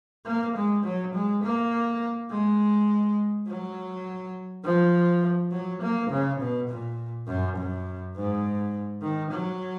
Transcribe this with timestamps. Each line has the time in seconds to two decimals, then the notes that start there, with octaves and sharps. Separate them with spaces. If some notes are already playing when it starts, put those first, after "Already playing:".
0.26 A#3
0.56 G#3
0.84 F#3
1.14 G#3
1.44 A#3
2.31 G#3
3.48 F#3
4.64 F3
5.52 F#3
5.82 A#3
6.11 C#3
6.40 B2
6.68 A#2
7.27 F#2
7.56 F#2
8.15 G#2
9.02 D#3
9.31 F#3